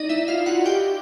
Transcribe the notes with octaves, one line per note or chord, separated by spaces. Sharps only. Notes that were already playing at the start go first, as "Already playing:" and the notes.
Already playing: D#4 D5 D#5
E4 E5
F4 F5
F#4 F#5
G4 G5